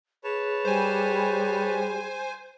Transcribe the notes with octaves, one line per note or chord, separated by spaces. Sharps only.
G#4 B4 C#5 A5
G3 C5 G#5